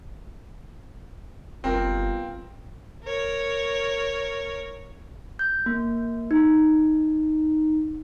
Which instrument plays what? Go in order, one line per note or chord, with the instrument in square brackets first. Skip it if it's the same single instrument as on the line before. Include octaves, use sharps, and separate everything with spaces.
[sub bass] F#1 [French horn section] G3 B3 F4 [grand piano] C4 A#4
[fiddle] A#4 C#5
[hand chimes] G6
A#3
D#4